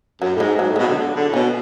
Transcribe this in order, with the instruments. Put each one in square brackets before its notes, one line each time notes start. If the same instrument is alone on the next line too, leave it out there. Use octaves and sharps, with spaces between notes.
[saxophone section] F#2 [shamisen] F#3
[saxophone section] A2
[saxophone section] G#2 [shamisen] G#3
[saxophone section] G#2 [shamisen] F#3
[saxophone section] A2
[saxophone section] B2 [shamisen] G#3
[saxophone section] D3 [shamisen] F#3
[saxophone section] D3
D3
A2
[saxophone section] B2 [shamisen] C#4